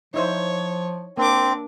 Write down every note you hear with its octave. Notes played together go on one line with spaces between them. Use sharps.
F3 D#4 E4 C5 C#5
A#3 C4 D4 D6